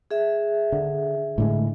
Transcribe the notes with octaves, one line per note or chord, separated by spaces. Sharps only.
G#4 E5
D3
A2 D3 G#3